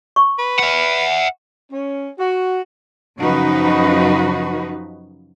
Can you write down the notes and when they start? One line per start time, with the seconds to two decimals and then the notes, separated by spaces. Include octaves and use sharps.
0.16 C#6
0.39 B4
0.59 E5 F#5
1.72 C#4
2.19 F#4
3.19 F#2 C#3 F3 D#4 F#4 B4